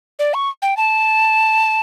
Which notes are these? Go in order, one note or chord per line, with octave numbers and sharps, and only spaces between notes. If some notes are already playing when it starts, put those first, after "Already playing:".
D5
C#6
G5
A5